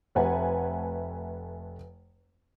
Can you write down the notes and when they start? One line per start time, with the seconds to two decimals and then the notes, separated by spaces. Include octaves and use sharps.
0.15 F1 A3 B4 F#5 G#5